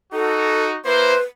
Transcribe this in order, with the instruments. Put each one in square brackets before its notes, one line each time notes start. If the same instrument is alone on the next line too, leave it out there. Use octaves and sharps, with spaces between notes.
[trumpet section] D#4 F#4 [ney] A4
[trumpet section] A#3 E4 C5 [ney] B4